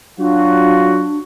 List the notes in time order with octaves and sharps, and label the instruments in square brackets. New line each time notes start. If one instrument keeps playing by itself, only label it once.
[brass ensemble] F#3 F4 F#4 [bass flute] D4